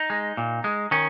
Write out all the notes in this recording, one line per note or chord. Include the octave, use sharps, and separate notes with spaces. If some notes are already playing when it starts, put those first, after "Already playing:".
Already playing: D#4
G#3
A#2
G#3
D#3 C#4